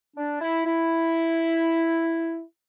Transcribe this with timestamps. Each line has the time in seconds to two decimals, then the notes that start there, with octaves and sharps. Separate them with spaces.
0.17 D4
0.41 E4
0.66 E4